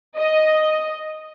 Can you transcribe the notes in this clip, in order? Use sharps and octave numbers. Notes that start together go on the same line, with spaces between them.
D#5